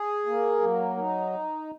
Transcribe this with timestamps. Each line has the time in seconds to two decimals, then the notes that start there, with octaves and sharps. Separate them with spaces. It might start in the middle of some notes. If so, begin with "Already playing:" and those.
Already playing: G#4
0.26 A#3
0.61 F#3
0.97 D#4